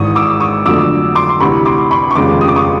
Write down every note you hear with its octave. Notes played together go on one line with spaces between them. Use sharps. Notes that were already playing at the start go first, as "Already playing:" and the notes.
Already playing: G#1 G#2 E3 C#6 D#6
D6 E6
C#6 D#6
F2 D3 F#3 A3 D6 E6
C6 D6
C6
D2 C3 E3 B5 C#6
C6 D6
B5 C#6
C#6
F1 D#2 C#3 F3 G#3 C6 D6
D#6
D6
C#6 D#6